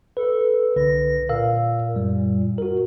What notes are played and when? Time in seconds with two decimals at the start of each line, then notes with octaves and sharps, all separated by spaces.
0.17 A4 B4
0.76 C2 D3 B4 A#6
1.29 A#2 A#4 F5 E6
1.94 F#2 G3
2.58 F#4 A#4